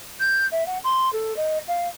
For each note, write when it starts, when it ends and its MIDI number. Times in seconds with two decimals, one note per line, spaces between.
0.19 0.45 91
0.51 0.66 76
0.66 0.78 78
0.83 1.10 84
1.12 1.35 69
1.36 1.58 75
1.68 1.87 77